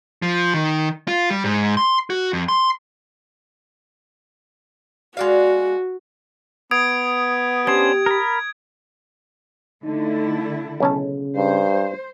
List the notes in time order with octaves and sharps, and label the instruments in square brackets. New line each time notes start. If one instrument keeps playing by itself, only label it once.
[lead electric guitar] F3
D#3
F4
G3
G#2
C6
F#4
F2
C6
[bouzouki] G#3 D4 F5 [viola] F#4
[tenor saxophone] B3 [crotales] D#6 G#6 D7
[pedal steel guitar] C#4 D4 C5 [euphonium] G4 [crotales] G#6
[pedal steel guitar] A#4 B5
[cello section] D3 A3 E4 [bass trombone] D#4
[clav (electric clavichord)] B1 C#4 A5 [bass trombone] C#3
[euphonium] G2 [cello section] C5